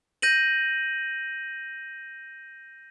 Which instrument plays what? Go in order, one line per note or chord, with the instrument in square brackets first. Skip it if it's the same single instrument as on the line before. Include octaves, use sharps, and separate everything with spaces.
[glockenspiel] G6 A#6 D#7 F#7